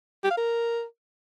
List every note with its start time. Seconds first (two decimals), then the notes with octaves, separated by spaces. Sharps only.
0.24 G4
0.31 F5
0.37 A#4